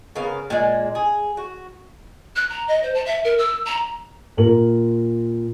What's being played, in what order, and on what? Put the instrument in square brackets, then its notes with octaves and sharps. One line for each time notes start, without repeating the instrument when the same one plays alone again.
[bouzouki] C#3 B3 A#4 F5
A#2 G#3
G#4
F#4
[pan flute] F#6
A#5
D#5
C5
A5
E5
A#4
E6
A#5
[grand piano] A#2 A#4 F#7